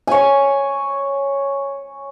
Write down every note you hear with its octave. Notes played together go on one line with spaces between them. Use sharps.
C#5 G#5